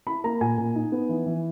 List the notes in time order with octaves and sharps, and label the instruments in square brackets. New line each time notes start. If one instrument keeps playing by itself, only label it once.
[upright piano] E4 B5
A#3 A#5
A#2 G#5
A#2
D#4
B3
E3
E3